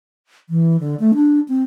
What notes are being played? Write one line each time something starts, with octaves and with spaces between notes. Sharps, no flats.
E3
D3
A3
D4
C4